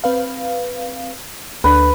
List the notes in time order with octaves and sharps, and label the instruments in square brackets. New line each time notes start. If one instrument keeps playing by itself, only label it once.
[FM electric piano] C4 B4 F5
[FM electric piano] D2 D4 [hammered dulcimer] B4